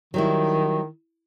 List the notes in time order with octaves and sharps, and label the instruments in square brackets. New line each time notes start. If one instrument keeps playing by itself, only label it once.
[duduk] D#3 [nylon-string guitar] F#3 G3 E4